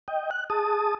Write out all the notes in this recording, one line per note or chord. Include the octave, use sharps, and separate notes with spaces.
D#5 G5
F#6
G#4 A5 D#6